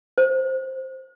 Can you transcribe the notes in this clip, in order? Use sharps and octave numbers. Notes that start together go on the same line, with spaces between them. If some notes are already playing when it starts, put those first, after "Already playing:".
C5